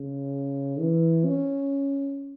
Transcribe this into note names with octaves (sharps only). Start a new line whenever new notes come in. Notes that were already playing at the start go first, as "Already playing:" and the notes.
Already playing: C#3
E3
C#4